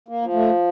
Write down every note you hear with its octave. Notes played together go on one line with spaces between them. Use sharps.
A#3
F3
A3